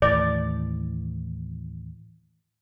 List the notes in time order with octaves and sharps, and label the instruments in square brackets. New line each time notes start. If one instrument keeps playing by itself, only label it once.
[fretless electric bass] D#2 A2 E3 [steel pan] D5